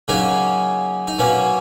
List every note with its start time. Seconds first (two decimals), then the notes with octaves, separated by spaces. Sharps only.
0.08 C#3 F#3 A#3 C#4 D#4
1.07 D#4
1.19 B2 F#3 A#3 C#4